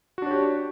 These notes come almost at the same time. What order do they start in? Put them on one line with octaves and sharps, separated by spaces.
F#4 D4 C#5 G4